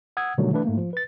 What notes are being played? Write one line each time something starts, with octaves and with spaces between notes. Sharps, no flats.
F#5 D#6 E6 G#6
B2 D3 D#3 F#3 G3 A3
E3 A3 D4 B4
G#2 A3 A#3
F3
B4 A6